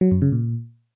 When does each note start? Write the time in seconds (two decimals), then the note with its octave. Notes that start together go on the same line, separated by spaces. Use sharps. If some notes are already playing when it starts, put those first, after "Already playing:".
0.01 F#3
0.11 F#2
0.22 C#3
0.32 A#2